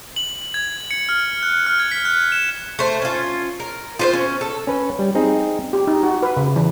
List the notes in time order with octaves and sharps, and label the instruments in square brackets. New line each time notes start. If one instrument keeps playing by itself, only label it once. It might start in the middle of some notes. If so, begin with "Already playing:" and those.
[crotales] F#7
G#6
C#7
F6
F#6
F6
G#6
B6
F#6
E7
[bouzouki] A3 C5
C#4 F4
A#4
F4 B4 C5
C#4
A4
[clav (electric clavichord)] C#4 B4
G3
C4 D#4 G#4
[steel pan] G4
D#4
F#4
B4
C#3
E3